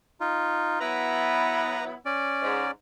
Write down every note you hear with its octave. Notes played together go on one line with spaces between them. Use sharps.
D#4 F4
F#3 B3 E4 B4 A#5
C#4 D5
G#2